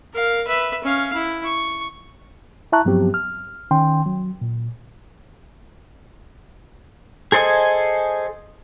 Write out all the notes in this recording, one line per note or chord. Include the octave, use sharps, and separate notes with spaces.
A#4 F5
B4 E5
C#4 F5
E4
C#6
E4 E5 A5 A#5 C#6 F#6
G2 F3 F#3 B3 C4 G4
F6
D#3 C#4 G5 C6
F#3
A#2
G#4 A4 C5 D#5 G#5